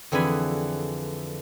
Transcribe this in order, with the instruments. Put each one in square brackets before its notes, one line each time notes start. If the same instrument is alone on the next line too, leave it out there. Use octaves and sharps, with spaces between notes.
[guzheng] F2 D3 E3 G#4 G#5 B5